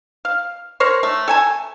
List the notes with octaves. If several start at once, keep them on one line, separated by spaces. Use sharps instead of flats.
F5
A#4 C5 C#5
A3
A4 G#5 A5